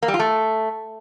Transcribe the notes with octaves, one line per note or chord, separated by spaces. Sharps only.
A#3
G3
F4
A3